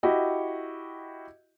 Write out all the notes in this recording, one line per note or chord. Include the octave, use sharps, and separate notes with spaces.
E4 F#4 G4 D#5